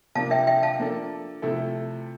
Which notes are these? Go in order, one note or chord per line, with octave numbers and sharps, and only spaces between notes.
C3 F3 A#3 D4 F5 A5
E5 G5
E5 G5
F5 A5
F3 A#3 D4 A4
C3 F3 A3 E4 A4